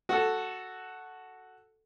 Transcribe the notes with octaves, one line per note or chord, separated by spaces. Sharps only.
F#4 A4